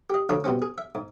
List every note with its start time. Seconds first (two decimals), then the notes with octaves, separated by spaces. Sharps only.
0.10 G4 D#5
0.29 D2 F3 D4 A4 C#5 D#6
0.44 B2 G3 C4 C#4
0.62 G#4
0.78 E5
0.95 G#2